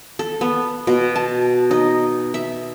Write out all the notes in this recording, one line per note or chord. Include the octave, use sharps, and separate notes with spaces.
A4
B3
B2
A5
D#4
E5